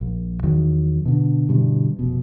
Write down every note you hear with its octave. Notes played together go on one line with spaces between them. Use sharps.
A#1
E2 D#3 F#3
B2 D3
G2 B2 D3 E3
F1 B2